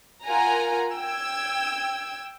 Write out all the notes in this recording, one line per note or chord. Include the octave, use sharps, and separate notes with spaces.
F4 A#4 F#5 G#5 A#5
G5 E6 G#6